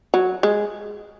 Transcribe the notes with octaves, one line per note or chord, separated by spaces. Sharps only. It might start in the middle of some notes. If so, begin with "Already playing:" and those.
F#3
G#3